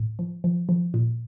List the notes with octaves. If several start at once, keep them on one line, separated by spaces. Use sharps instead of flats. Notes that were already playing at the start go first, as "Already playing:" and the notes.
Already playing: A2
F3
F3
F3
A#2